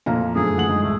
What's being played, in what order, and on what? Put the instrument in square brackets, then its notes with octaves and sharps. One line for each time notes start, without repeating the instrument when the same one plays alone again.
[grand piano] F2 A#2 [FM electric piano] A3 [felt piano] F5 A#5
[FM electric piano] F#2 D3 F3 [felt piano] A3 [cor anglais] G#4
[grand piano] E3 F#5 F#7
[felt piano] G#3 [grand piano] D#4
[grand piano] C2 [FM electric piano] A2 [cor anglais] A3